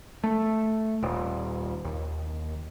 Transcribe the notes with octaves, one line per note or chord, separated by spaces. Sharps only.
A3
D#1
D#2